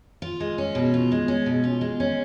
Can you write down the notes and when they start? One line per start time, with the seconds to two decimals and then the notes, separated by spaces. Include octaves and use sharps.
0.22 F4
0.40 G#3
0.58 C#4
0.75 B2
0.94 F4
1.12 G#3
1.28 C#4
1.46 B2
1.64 F4
1.81 G#3
2.00 C#4